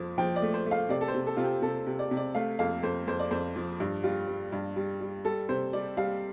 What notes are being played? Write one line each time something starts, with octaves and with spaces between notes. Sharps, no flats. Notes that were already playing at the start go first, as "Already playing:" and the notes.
Already playing: F2 F3
F3 G5
D5
A3
C5
A3
F5
C3 D5
A4
C5
C3
A4
C3 F4
G4
C3 A4
C3
D5
C3
D5
A3 F5
F2 F5
F2 C5
F2 C5
D5
F2 C5
F3
G2
G3 F4
G3
G2
G3
G3
G3 A4
C3 C5
G3 D5
G3 F5